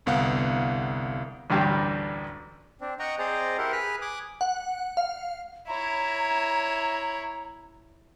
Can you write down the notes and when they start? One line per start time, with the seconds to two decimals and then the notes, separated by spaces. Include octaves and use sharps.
0.06 G1 C2 B3 F5 F#5
1.50 A1 D2 G2 G3 D4
2.81 C4 D4
2.99 D#5 F#5 G5 A#5 C#6
3.19 C4 G#4 C5 D5 D#5 A#5
3.58 E4 G4 A#4 C5 F#5
3.72 G#4 B4 B5 F6 F#6
4.02 G#5 D6 D#6 F#6
4.41 F#5
4.97 F5
5.68 E4 C#5 A#5